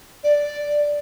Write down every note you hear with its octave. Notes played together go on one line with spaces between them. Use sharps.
D5